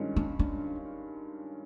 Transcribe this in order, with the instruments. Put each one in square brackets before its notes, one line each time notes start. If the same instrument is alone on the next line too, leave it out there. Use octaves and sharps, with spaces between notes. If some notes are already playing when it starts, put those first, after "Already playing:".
Already playing: [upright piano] G2 D#3 G#3 C#4 F4
[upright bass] D4
D4